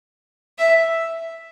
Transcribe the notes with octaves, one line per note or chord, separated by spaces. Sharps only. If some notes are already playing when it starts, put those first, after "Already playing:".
E5